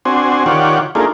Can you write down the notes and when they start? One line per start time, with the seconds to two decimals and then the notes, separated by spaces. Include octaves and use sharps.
0.05 C4 D4 F#4 C5 G#5
0.46 D#3 F4 G4 C#5 D5 F#5
0.95 A3 A#3 D4 D#4 F4 G#4